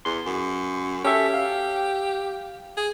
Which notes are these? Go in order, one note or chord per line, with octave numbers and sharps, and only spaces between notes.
E2 C6
F#2
C#4 G4 A4 E5
F5
G#4